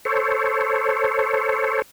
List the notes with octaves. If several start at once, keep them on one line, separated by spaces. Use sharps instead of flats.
A4 C5 C#5